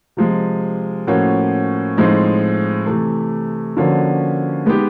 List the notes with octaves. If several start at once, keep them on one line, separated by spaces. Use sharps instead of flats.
C3 F3 G#3
A2 F3 A#3 C#4 F#4
A2 F3 G#3 C4 D#4
C3 E3 A3
D3 F3 A#3 C#4 F#4
G#3 B3 D#4 G4